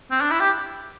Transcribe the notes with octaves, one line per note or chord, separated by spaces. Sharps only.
C4
D4
E4
G4